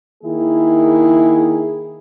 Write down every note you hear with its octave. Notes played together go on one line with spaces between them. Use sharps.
D#3 A#3 E4 G#4